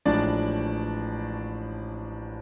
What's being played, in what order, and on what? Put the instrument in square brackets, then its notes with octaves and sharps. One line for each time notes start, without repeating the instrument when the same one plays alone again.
[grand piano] A1 A2 F3 G#3 D4 D5